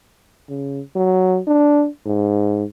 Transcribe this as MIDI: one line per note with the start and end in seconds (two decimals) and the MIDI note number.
0.49 0.81 49
0.95 1.40 54
1.47 1.88 62
2.06 2.64 44